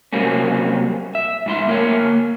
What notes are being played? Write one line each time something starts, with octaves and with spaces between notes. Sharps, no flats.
C3 F#3 G3 A#3 C4 C#4
E5
G#2 E4 C6
A#3 A#4 C#5